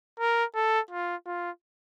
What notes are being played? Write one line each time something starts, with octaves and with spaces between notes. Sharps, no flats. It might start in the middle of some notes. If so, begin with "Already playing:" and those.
A#4
A4
F4
F4